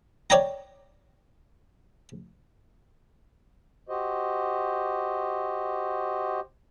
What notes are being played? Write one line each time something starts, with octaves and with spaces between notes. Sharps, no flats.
C#5 D5 G5 A5 A#5
F#4 G4 C5 D#5